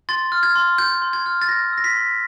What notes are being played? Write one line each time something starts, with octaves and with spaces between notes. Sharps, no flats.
C6 A6
F6
G#6
C6
F6 G6
C6
G#6
F6
A6
G6 A#6
E6 A#6
B6
C6